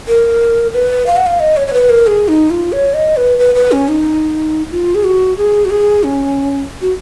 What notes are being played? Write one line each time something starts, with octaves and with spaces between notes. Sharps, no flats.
A#4
B4
F5
F#5
F5
D#5
C#5
C#5
B4
A#4
G#4
D#4
F4
C#5
D#5
B4
B4
B4
C#4
D#4
F4
G#4
F#4
G#4
F#4
G#4
C#4
F#4